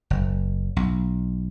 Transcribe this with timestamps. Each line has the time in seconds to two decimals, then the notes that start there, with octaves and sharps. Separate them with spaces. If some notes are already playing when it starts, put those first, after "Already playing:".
0.10 F#1
0.76 B1